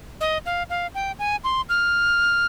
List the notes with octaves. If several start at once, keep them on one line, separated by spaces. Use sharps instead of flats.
D#5
F5
F5
G5
G#5
C6
F6